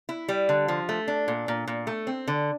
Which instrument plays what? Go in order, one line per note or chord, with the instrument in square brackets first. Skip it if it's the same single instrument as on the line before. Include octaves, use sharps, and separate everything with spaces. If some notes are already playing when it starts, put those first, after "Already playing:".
[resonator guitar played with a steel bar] E4
G3
D3
F3
A3
D4
A#2
A#2
A#2
A3
C4
D3